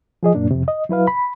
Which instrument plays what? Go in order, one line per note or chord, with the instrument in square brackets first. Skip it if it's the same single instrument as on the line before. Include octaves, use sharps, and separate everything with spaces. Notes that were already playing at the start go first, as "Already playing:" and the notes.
[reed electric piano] F3 G#4 D#5
F#2 A#2 A#3 D4
F2 C3
D#5
F#3 E4 B4 F5
B5